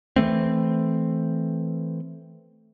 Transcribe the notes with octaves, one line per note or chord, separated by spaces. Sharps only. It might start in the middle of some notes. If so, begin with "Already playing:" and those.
E3 F#3 A3 C4